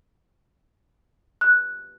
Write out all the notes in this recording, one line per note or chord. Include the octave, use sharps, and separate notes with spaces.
F#6